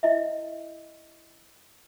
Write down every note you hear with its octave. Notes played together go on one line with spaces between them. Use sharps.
E4 D#5 E5